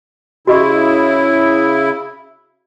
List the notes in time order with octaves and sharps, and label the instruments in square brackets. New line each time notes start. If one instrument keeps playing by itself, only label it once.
[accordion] C#3 E4 [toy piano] F#4 D#5 C#6